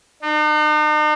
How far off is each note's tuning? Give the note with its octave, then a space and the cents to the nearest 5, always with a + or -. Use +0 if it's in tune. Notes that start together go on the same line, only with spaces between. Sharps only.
D#4 -45